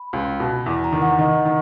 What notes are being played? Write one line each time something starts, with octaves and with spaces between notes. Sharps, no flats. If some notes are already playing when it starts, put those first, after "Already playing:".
Already playing: B5
C#2
B2
E2
A#5
D#3
F#5
D#3 D#5
D#3